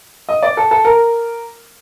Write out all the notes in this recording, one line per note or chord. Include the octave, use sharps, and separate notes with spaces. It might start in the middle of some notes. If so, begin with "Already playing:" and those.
D#5
D5
A4
A4
A#4